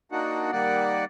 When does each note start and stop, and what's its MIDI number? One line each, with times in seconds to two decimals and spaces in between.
0.12 0.51 58
0.12 0.51 62
0.12 0.51 63
0.12 0.51 66
0.12 0.51 78
0.52 1.05 51
0.52 1.05 55
0.52 1.05 58
0.52 1.05 74
0.52 1.05 78